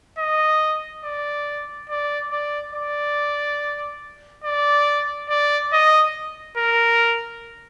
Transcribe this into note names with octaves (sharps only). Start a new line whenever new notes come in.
D#5
D5
D5
D5
D5
D5
D5
D#5
A#4